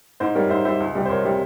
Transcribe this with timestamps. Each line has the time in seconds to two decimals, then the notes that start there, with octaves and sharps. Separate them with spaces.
0.20 G#2 C5
0.35 G3 A#4 C#5
0.49 G#2 C5 E5
0.65 G3 C5 E5
0.80 C#2
0.95 C3 G3
1.06 C5
1.10 C#2 A#4 C#5
1.25 C3 G3